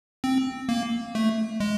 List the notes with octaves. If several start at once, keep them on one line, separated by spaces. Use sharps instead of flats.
C4
A#3
A3
G#3